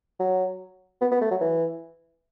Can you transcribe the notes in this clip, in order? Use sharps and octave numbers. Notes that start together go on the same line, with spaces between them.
F#3
B3
B3
A3
F#3
E3